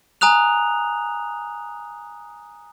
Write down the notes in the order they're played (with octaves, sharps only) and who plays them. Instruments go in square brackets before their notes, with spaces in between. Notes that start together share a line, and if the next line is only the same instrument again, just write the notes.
[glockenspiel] G#5 A#5 D#6 F#6 F7